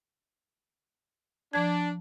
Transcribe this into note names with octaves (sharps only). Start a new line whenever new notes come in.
F3 D4 A5 G#6